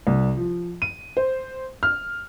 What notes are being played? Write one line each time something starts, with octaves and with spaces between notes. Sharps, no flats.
C2
F3
D#7
C5
F6